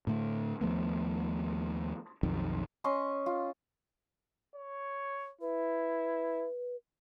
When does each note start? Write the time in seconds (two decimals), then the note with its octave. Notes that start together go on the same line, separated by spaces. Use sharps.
0.07 A2 D3 A3
0.61 D#2 F3 A3 B3
2.23 B1 F2 D#3
2.84 C#4 D#5 C6 C#6
3.26 F4
4.55 C#5
5.41 E4 B4